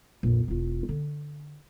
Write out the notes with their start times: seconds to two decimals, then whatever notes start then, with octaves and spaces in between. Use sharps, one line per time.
0.23 A#1 F2
0.48 E1 F4
0.89 D3